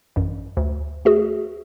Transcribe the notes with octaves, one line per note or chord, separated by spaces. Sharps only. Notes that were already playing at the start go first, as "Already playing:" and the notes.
A1 F#2
D2
A3 F#4 G#4